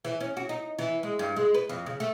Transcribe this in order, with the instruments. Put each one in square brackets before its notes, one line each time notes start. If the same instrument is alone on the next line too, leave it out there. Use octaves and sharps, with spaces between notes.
[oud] E3
C#4
F#4
D#4
E3
G#3
G2
G#3
B4
F2
C#3
A3